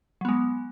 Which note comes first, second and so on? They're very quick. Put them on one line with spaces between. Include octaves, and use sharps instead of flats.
F#3 B3 G#3